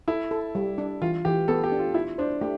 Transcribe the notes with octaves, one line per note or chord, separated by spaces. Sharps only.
E4 A4
A4
G3
D4
E3 F4
E3 G4
B3 A4
G4
D4
F4
E4 F4
D4 C5
A3 G4